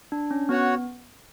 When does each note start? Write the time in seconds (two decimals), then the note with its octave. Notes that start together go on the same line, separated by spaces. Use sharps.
0.12 D4
0.31 C#4
0.49 B3 F#4 C#5 F#5